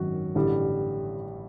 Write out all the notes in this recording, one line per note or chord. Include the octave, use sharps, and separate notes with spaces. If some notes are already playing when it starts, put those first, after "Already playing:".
Already playing: G#1 F#2 D#3 F#3 F#4
A1 G2 D3 G3